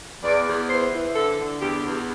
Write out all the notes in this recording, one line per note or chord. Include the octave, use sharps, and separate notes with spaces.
E2 D5
E2
E3 C5
E3
D3 A4
D3
E2 G4
E2